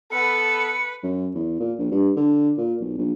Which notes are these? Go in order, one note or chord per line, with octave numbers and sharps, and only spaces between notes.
B3 A4 B4 C#7
F#2
E2
A#2
A#1
G2
D3
A#2
B1
A#1